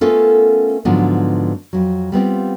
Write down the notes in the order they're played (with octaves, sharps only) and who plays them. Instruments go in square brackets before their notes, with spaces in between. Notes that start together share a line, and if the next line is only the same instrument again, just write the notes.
[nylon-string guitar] A3 B3 C#4 F4 A4 A#4
G#2 D3 F3 F#3 B3
F2 F#3
G3 B3 C4 F4